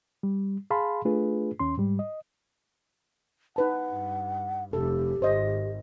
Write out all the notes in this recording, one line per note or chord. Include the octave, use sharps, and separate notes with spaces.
G3
G#4 F5 A5 B5 C6
A3 D4 F4 G#4 B4
D#2 C#4 C6
G#2 G3
D#5
D#4 B4 F#5 A5
G2
F1 G4 A4
G#1 C5 D#5